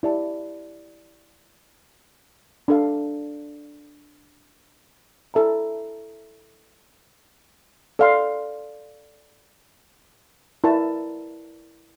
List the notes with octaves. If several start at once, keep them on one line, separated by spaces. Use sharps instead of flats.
E4 G4 D5 A5
D4 A4 D5 F5
E4 A4 E5 A#5
A4 D5 F5 C6
E4 A#4 D5 A5